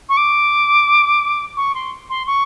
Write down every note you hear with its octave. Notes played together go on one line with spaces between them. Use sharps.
C#6
D6
C#6
C6
C6
C#6